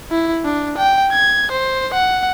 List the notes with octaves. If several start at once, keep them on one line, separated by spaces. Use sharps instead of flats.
E4
D4
G5
G#6
C5
F#5